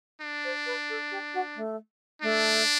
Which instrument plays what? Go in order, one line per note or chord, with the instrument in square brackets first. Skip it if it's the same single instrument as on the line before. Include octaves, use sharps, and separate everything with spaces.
[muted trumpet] D4
[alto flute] C5
B4
A4
G4
F#4
A3
[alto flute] A3 [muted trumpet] D4